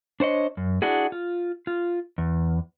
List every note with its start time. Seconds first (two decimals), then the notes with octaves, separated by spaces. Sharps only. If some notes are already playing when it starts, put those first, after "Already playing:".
0.20 D4 C5 C#5 D#5
0.57 F#2
0.82 D4 E4 F#4 G#4
1.12 F4
1.67 F4
2.18 E2